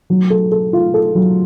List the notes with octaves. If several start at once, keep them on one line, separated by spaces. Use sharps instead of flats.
F#3
A4
A4
F4
A4
F#3